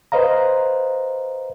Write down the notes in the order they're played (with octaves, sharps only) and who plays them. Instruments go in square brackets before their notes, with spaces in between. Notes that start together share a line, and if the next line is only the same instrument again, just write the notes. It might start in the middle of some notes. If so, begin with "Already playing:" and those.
[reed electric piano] B4 C5 D#5 F5 A#5